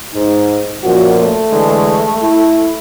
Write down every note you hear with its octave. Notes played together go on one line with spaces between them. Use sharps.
G#2 D#4
F#2 A#2 F3 F#4
A3
D3 E3 G#3
E4